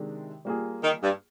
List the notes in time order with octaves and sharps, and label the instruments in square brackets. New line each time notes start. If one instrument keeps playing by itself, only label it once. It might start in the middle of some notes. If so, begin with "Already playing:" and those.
Already playing: [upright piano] C3 D#3 G#3 D4
G3 A#3 F4 G#4
[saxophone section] D#3
G2